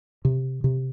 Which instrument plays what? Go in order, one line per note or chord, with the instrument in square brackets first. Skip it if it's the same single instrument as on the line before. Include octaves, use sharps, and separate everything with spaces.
[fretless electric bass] C3
C3